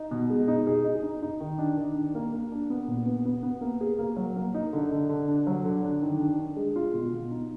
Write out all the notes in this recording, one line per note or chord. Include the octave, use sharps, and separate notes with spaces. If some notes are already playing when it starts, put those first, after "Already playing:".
Already playing: D#4
B2
G#3
D#4
G#4
D#4
D#4
D#4
D#3
D4
D#3
D4
A#3
A#3
D4
B3
A#2
B3
B3
B3
A#3
G#4
A#3
F#3
A#3
D#4
D3
D3
D3
D4
F#3
D3
D4
D#3
D4
D4
G#3
F4
B2
B2
D#4